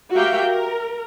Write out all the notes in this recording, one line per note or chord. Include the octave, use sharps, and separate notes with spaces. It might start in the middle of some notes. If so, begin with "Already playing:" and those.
F#4 G4 A#4 E5 F5 G5
A#4